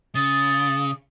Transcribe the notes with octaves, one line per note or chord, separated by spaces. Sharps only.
C#3 D#6 A6